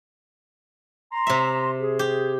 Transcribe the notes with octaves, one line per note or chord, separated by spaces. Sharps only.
A#5 C6
C3 E5
G#4
G4